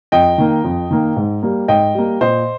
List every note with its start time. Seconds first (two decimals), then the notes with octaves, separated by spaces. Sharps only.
0.12 F2 D#5 G5
0.38 D#3 A#3
0.64 F2
0.91 D#3 A#3
1.17 G#2
1.43 G3 A#3
1.68 G#2 D#5 G5
1.95 G3 A#3
2.21 A#2 C5 D#5